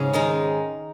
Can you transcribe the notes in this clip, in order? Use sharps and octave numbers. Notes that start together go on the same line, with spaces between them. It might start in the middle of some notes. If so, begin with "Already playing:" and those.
Already playing: G#2 C#3 C#4 G#4
D#3 G#3 D#4